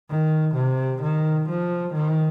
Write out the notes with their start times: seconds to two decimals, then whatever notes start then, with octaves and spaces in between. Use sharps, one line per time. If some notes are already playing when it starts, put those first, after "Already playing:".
0.10 D#3
0.56 C3
1.03 D#3
1.49 F3
1.94 D#3